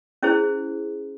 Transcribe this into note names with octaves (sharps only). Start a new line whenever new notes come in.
C#4 E4 G#4 C5